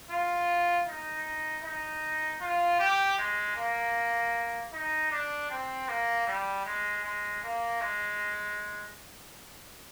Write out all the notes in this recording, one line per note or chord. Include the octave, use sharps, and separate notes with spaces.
F4
D#4
D#4
F4
G4
G#3
A#3
D#4
D4
C4
A#3
G3
G#3
G#3
A#3
G#3